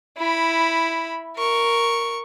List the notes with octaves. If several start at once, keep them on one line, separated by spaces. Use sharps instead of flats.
E4 B5
A#4 C#6